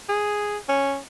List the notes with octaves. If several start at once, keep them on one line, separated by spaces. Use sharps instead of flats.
G#4
C#4